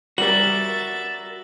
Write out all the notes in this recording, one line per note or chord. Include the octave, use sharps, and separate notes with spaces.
G3 F#4 A#4 E5 A6 F#7